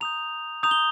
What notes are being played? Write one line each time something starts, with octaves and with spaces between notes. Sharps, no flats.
A#5 D#6 G6 F7
A#5 D#6 G6 F7
G7